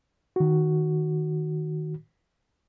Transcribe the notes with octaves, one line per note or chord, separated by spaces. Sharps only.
D#3 F#4